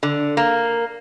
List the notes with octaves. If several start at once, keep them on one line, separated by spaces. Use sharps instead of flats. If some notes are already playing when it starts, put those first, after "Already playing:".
D3
A#3